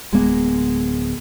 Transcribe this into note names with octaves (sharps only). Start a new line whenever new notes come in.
D1 G#3 A#3 B3